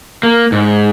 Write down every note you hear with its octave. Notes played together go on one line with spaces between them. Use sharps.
A#3
G#2